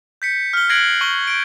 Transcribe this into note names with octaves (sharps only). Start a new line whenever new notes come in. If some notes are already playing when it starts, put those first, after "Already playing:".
G6 B6 C#7
F6 G7
F#6 G#6 A#6 C7 D7 F#7
C#6 G7
G6 D7